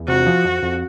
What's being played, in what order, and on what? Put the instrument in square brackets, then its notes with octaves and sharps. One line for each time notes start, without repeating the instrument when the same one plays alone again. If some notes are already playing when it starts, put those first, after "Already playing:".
Already playing: [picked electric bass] E2
[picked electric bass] C3 [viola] F#4
[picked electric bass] F3
F2
F2